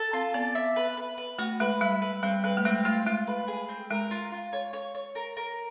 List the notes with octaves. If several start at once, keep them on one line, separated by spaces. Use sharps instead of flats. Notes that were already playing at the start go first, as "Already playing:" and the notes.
Already playing: A4
C4 F4
B3 D5
E5
B4
B4
B4
A3 F#4
G#3 B4
G3 E5
B4
G3 C4
G3 B4
A3
G#3 C4
A3 F4
G#3 F4
B4
G#4
C4
G#3 A#4
F4
F4
C#5
C#5
C#5
A#4
A#4